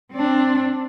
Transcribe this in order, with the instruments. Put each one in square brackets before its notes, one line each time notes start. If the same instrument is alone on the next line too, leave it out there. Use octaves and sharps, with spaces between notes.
[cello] C4 D4